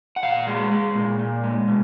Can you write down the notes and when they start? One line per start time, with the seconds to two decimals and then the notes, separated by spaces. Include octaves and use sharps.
0.16 F#5
0.23 A#2 F5
0.47 G#3
0.71 G#3
0.95 A#2
1.19 A#2
1.44 G#3
1.68 B2